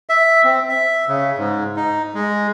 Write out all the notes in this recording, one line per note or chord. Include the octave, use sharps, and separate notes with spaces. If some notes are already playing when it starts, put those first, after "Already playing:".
E5
C4
E5
C#3
G#2
D#4
G#3